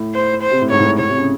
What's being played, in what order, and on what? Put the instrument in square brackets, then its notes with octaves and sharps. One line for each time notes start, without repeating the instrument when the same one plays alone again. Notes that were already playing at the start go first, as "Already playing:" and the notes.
Already playing: [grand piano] A2
[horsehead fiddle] C5
C5
[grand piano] C3
A2
[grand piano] G#2 [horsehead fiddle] C#5
[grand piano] A2
G#2
[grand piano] A2 [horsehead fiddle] C#5
[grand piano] C3
C#3